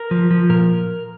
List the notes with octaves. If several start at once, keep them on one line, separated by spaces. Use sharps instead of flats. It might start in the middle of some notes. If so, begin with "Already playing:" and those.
Already playing: A#4
F3
F3
A#2 A#4